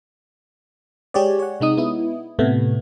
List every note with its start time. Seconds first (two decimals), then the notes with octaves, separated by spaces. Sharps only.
1.14 G#3 G4 G#4 C#5 D5
1.39 C#5 F#5
1.60 C3 G#3 D#4 D#6
1.77 B3 E4
2.39 A2 C3 A3 B3